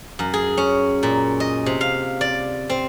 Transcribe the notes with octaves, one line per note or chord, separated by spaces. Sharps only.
F#2
G#4
C#4
A#2
D#5
C3
F5
D5
C4